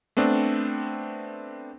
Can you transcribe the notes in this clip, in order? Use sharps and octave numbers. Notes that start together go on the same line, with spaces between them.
A3 B3 C4 D4